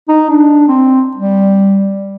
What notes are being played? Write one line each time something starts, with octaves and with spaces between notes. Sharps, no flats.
D#4
D4
C4
G3